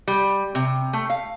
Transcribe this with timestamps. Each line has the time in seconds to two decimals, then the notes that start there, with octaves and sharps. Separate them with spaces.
0.08 G3
0.55 C3
0.93 A3
1.10 F5